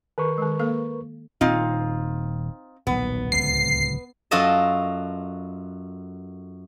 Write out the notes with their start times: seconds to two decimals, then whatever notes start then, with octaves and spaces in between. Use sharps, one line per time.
0.18 D#3 A#4 B4 C#6
0.38 D#3 G#3
0.59 A#3 A4 F5
1.41 D#1 C4 D#4 F4
2.87 D#1 B1 B3
3.32 D1 C#2 C#3 C7
4.31 F#2 F4 F#4 A4 D#5 A5